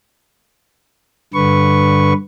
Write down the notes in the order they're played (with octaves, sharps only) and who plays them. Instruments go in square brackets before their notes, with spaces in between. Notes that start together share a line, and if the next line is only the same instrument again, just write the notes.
[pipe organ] G2 D3 B4 C#6